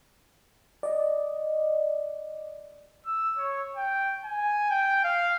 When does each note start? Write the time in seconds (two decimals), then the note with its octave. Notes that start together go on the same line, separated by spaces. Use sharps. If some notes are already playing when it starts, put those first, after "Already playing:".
0.83 D5 D#5
3.06 E6
3.38 C#5
3.76 G5
4.25 G#5
4.70 G5
5.04 F5